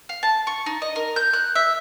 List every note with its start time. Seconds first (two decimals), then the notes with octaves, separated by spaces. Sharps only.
0.09 F5
0.23 A5
0.47 C#6
0.66 D#4
0.82 D#5
0.96 A#4
1.16 G6
1.33 F#6
1.55 E5